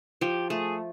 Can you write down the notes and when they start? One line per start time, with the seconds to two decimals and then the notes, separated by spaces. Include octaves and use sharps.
0.21 F3 G4
0.50 A3 G#4